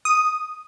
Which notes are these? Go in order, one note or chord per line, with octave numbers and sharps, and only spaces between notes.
D#6